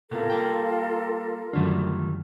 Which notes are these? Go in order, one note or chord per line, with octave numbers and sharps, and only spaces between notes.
A2 C3 B3 F4 A4 A#4
G3 A#3 G5
F#2 D3 D#3 G3 A3 F4